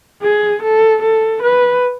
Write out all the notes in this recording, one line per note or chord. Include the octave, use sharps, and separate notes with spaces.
G#4
A4
A4
B4